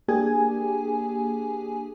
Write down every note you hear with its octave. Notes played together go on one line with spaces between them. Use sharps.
A#3 D4 G4 G#4 G#5